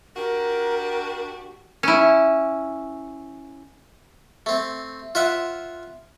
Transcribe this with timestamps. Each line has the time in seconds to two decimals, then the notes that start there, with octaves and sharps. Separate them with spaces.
0.17 D4 F#4 G4 A#4
1.83 C#4 E4
4.46 A3 C4
5.15 F4 C5 E5 F#5